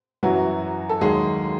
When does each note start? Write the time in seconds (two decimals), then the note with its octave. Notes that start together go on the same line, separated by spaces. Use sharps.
0.23 F#2 E3 F#3 F#4
0.89 A4
1.01 D#2 D#3 F#3 G#3 G#4